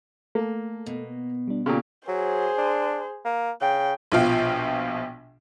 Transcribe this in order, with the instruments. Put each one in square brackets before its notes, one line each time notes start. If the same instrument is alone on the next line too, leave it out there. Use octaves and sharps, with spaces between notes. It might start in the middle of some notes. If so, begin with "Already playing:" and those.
[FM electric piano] A3 A4 [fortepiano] A#3
[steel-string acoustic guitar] B2
[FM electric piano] G3 D4
[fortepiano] A#2 C#3 [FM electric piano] G4 A4 G5
[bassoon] F#3 [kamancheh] G#4 C5
[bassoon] D4
A#3
[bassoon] C#3 [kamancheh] G5
[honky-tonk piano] A#1 B2 F3 F5 G5